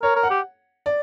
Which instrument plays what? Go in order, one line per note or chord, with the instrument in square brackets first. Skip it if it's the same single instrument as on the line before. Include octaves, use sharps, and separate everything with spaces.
[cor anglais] A#4 [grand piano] C#5
[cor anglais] A#4
[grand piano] F#5
[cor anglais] G4
[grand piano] D5